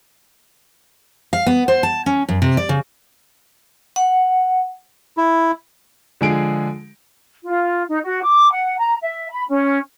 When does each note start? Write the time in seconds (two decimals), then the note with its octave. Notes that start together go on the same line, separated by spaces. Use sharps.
1.33 F5
1.46 B3
1.68 C5
1.83 A5
2.06 C#4
2.29 F#2
2.42 C3
2.57 D5
2.69 C#3
3.96 F#5
5.17 E4
6.21 D3 F3 G#3 G#4 D7
7.44 F4
7.88 D#4
8.04 F#4
8.22 D6
8.51 F#5
8.78 A#5
9.02 E5
9.31 B5
9.48 C#4